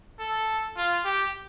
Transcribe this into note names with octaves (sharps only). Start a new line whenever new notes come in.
A4
F4
G4